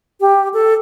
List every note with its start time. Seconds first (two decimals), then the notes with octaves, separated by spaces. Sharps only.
0.21 G4
0.53 A4